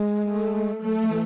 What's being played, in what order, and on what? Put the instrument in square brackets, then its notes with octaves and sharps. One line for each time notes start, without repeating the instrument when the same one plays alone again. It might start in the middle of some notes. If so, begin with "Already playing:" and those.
Already playing: [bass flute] G#3
[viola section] A3
[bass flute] F#3 [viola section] A3
[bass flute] F#3
E3